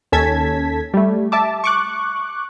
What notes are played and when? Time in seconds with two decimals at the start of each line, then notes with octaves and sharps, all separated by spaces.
0.12 D#2 C#4 A4 A5 G#6 B6
0.94 G3 A3
1.32 E5 A5 D6
1.64 C#6 D6 F#6